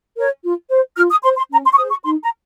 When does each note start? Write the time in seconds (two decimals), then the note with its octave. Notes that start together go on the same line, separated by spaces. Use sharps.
0.15 A#4 C#5
0.42 F4
0.69 C5
0.96 F4 F6
1.10 D#6
1.23 C5 C6
1.36 C6
1.50 C#4 A#5
1.64 C6
1.72 C#6
1.77 G#4 C5 D#6
1.90 C#6
2.03 D#4 C6
2.22 A#5